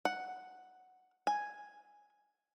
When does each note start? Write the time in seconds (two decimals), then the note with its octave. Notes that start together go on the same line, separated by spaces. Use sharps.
0.05 F#5
1.27 G#5